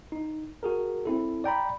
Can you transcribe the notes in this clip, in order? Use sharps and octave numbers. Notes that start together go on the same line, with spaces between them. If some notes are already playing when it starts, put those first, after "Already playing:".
D#4
F#4 G#4 A#4
C4 E4 A4
D5 G5 A#5 B5